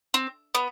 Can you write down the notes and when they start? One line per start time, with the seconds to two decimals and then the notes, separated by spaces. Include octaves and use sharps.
0.14 C4
0.55 B3